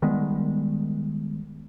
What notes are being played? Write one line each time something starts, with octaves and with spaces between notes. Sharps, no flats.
D#3 G3 G#3 B3